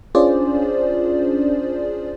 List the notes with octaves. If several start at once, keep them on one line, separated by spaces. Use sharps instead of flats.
C#4 D4 F4 G#4 C5 D5